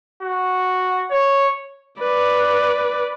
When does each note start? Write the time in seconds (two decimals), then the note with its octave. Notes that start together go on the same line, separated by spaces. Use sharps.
0.22 F#4
1.11 C#5
2.00 B4 D5